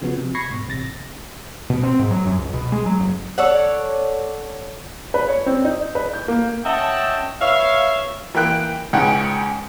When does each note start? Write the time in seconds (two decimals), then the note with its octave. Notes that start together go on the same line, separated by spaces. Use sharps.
0.02 C#3 F3 B3 F#4
0.17 C3
0.35 B5 C#6 G#6 A#6 C7 C#7
0.50 G#2 B2
0.68 A1 C3 A6 A#6
1.70 B2
1.83 C4
1.99 G#2
2.11 F#3
2.25 F#2
2.38 C#2
2.54 B2
2.72 G#3
2.86 F#3
2.99 F#1
3.38 A4 C#5 D5 F#5
5.14 B4
5.28 C#5
5.46 C4
5.65 D#4
5.95 B4
6.13 G6
6.28 A#3
6.64 C#4 D#5 E5 F#5 G5 A5
7.41 B4 C#5 E5 F5
8.34 E3 A#3 G5 F#6
8.93 C#2 G#2 C#3 F#5 G5